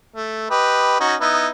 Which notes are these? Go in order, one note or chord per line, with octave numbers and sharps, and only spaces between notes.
A3
G4 B4 D#5
C#4 D#4 F#4
B3 D#4 E4